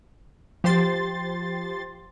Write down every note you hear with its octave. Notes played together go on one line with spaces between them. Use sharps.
F3 G4 C5 C6 A6